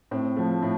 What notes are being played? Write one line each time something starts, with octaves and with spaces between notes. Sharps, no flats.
A2 C4
F3 A3
A2